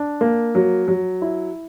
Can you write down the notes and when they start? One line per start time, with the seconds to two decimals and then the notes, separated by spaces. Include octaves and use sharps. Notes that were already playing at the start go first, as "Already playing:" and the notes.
Already playing: D4
0.21 A#3
0.55 F#3
0.88 F#3
1.22 E4